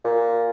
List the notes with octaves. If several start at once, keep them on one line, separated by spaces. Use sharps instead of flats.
A#2